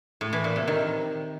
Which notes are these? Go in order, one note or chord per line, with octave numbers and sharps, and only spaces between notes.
A2
E3
A#2
C3
D#3